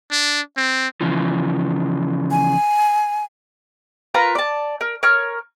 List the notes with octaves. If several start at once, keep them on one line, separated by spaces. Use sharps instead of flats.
D4
C4
C#3 E3 F3
G#5
F4 A#4 B4 A#5
D5 A5
A#4
A#4 C#5 F6